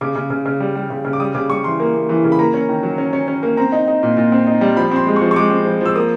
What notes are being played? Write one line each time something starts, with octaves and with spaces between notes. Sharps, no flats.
C#3 D6
C#3
C#3
C#3
G3
G3
C#3
C#3
D6
G3 D#6
C#3 D6
G3 C#6
E3 C6
A#3
A#3
E3
C#3
B5
A#3 A#5
C#4
D#3
F#3
C#4
C#4
C#4
A#3
C4 A#5
D#4
D#4
A#2
A#2
C4
D#4
G3
F3 B5
C4 C6
G#3
F3 C#6
C#6
G#3 D6
C4
F3
F3 E6
A#3 D#6